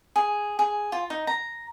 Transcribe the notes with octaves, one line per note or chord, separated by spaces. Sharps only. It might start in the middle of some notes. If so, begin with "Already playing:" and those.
G#4
G#4
F4
D#4
A#5